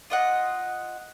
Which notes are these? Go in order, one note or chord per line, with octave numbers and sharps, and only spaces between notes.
F4 D#5 F#5